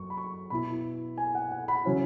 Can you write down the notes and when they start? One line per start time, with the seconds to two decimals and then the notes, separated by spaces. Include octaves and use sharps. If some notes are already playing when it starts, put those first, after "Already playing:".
Already playing: F#2 C#6
0.10 B5
0.18 C#6
0.50 B2 B3 E4 B5
1.18 G#5
1.35 F#5
1.52 F#5
1.68 B5
1.85 C#3 F#3 C#4 E4